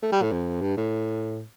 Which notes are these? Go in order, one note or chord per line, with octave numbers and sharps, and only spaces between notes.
A3
G3
A2
F2
G2
A2